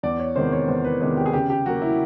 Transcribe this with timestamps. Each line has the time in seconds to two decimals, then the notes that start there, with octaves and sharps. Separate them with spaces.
0.03 E2 D5
0.19 C#5
0.36 C3 D#3 G#3 B3 C5
0.52 C#5
0.68 E2 C5
0.84 B4
1.01 C3 D#3 G#3 B3 B4
1.17 G4
1.26 G#4
1.33 C#3 G4
1.50 G4
1.66 F#3 A#3 F#4
1.82 E4